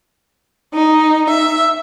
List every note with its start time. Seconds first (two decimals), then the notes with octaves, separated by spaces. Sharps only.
0.74 D#4
1.29 E5